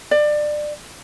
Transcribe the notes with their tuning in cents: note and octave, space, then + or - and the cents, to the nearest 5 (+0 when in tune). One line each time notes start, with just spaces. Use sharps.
D5 +25